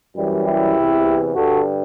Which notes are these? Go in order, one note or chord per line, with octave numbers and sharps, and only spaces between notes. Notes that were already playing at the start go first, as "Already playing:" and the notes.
F#2 E3 G3
E4 G4
E2 C3 E3
G2 D3 G3 F#4 A4